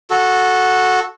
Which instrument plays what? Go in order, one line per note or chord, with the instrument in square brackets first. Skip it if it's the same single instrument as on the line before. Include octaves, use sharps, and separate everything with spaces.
[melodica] F#4 A4